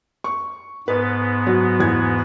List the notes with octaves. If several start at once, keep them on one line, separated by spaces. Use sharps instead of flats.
C#6
G#2 B3 B4
F#3
E2 G#6